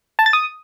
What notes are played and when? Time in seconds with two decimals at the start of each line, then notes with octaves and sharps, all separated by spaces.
0.19 A5
0.26 A6
0.33 D#6